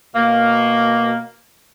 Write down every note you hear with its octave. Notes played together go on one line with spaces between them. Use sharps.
B2 A#3